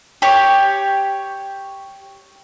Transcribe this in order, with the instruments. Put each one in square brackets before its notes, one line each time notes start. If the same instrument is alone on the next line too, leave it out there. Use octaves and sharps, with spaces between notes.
[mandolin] G4 C#5